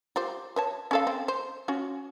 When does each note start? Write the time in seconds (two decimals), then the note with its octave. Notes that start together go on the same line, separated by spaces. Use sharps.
0.16 F4 G4 C5
0.56 B4 C#5 A5
0.91 C#4 A4 F5
1.07 C4
1.28 C5
1.68 C#4 F4 F#4